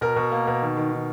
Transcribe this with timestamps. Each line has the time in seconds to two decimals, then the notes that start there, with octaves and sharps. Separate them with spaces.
0.01 B2 A#4
0.16 B2
0.32 A#3
0.47 B2
0.62 D#3
0.77 D#3
0.92 D#3